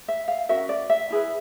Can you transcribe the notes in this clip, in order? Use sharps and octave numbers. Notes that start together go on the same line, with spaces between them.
E5
F5
C#4 F#4 A#4 E5
D5
E5
E4 G#4 B4